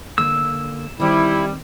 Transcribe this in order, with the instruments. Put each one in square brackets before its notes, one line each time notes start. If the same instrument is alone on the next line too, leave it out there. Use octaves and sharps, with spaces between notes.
[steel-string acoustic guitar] D3 A#3 [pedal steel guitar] E6
[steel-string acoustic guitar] D#3 C4 [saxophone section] G3 [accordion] E4